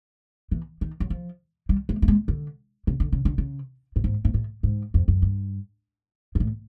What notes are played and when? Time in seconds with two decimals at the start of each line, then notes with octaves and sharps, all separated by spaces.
0.51 E3
0.81 D#3
1.00 F#3
1.10 F3
1.69 G3
1.89 G#3
2.02 A3
2.08 G#3
2.28 D3
2.87 C#3
3.00 D3
3.12 C#3
3.25 D3
3.38 C#3
3.96 A2
4.04 G#2
4.25 G#2
4.34 A2
4.63 G#2
4.94 F2
5.08 F#2
5.22 G2
6.35 G#2
6.40 A2